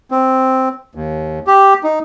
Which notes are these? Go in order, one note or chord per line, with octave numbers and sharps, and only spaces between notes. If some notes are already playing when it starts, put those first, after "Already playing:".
C4
D#2
G4
D#4